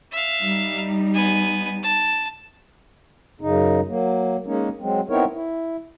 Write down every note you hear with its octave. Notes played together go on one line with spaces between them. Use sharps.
E5 F5
G3 D#4
B3 G#5
A5
F#2 C#3 D#4
F#3 A#3
G#3 A#3 C#4 D#4
F#3 G#3 C4
B3 C4 D#4 E4 A#4 C#5
E4